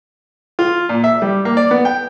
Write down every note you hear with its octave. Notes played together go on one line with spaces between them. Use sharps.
F4
A#2
E5
G3
A#3
D5
B3
G5